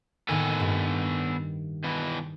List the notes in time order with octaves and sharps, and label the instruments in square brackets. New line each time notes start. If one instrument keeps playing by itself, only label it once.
[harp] A2 D#3 A#3 [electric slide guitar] B3 A4 G#5
[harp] G2
[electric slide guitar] B2 E3